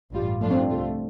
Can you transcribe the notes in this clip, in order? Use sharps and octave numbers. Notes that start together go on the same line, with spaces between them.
A1 G2 G3 F4
G2 F3 A3 D4 F4
C4
D4
C2 C3 A3 F4